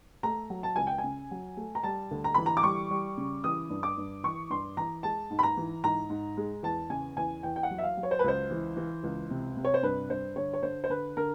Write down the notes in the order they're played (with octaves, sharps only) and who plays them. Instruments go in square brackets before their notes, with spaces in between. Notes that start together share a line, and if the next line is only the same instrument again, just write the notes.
[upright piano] A3 A#5
F#3
A5
C#2 G#5
G5
G#5
C#3
F#3
A3
A#5
G3 A5
D2
A#5
E3 B5
A#5
D6
G3 C#6
G3
C#3
E3 D#6
G2
D6
G2
E3 C#6
G2 C6
E3 A#5
G#3 A5
G#2
B5
A#5
E3
G#2 A#5
G#2
G#3
E2 A5
C#3 G#5
E2 G#5
E2 G5
G5
F#5
F#3
E5
F5
F#3
C#5
C5
B4
C#2 C5
E3
E3
C#2
C3
C3
C#5
C5
G2 B4
G2 C5
D3 C#5
C#5
D3 C5
C5
D3 B4
D3 A#4